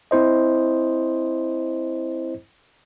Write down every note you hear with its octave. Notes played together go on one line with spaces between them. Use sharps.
C4 E4 C5 D#5